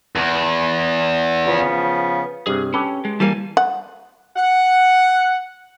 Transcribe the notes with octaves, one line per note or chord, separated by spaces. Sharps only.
E2
C#3 F3 B3
G2 C3 G#4
C#4 G4 A4 B4
G#3
E3 G3 A#3 G#5 A5
F#5
F#5